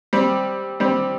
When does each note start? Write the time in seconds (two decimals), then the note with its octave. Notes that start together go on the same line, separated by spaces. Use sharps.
0.13 G3 C4
0.80 G3 C4